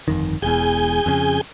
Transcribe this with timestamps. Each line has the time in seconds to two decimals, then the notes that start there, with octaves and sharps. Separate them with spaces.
0.08 G1 F2 D#3
0.42 E1 E2 G#4 G#5 G6
1.06 F2 C#3